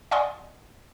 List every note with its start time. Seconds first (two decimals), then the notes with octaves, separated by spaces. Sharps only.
0.11 D5 D#5 F#5 G#5 C6 D#6